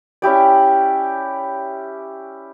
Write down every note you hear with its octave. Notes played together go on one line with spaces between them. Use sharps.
C#4 E4 G4 D5